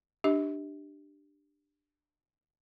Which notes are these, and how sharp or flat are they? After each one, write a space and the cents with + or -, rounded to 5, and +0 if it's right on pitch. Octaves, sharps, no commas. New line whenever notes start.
D4 +15 G4 +0 D#5 +45